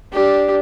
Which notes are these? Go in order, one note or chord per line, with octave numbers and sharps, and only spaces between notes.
D4 G4